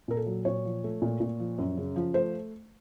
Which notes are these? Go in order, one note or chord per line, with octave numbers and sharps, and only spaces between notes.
A#2 A#4
A4
F#3
A#2 C#5
F3
A3
A#2
A#2
F3
F#2
C#3
F3
A3 C5